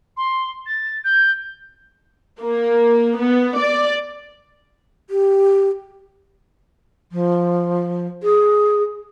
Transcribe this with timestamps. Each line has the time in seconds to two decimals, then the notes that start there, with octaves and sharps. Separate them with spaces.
0.16 C6
0.66 A6
1.04 G6
2.40 A#3
3.20 B3
3.59 D5
5.10 G4
7.12 F3
8.23 G#4